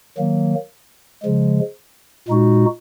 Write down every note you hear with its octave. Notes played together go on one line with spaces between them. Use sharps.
D#3 F#3 A#3
C#3 F3 G#3
A#2 G#3 D#4 F#4